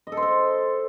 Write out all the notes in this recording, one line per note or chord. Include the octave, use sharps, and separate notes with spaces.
D#5
A4
C5
A4